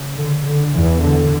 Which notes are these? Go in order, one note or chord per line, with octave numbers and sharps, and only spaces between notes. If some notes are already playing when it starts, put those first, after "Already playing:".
Already playing: C#3
D3
D3
E2 E3
D3